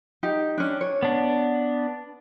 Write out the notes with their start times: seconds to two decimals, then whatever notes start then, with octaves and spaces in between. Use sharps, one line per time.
0.23 D#4 G4
0.58 C#4 D4
0.81 C#5
1.03 B3 D4